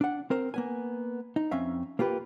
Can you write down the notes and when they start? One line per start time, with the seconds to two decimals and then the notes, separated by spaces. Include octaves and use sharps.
0.01 D4 F#5
0.30 C4 A#4 C5
0.54 A#3 B3 G#5
1.36 D#4
1.51 F2 C4 C#4 E5 F5
1.99 A#3 F4 G4 B4